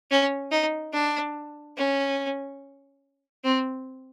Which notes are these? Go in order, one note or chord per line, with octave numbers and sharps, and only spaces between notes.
C#4
D#4
D4
C#4
C4